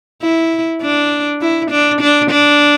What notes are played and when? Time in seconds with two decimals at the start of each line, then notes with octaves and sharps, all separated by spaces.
0.22 E4
0.82 D4
1.41 E4
1.71 D4
2.01 D4
2.30 D4